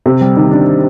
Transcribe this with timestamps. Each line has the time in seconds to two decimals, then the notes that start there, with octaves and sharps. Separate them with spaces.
0.06 C3
0.21 G3
0.37 D#3
0.51 D4